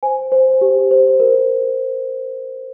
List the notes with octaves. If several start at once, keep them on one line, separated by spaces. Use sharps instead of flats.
C5 G#5
C5
G4
C5
A#4